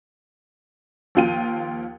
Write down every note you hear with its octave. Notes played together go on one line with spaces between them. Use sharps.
D#2 F3 F4 G5 D#7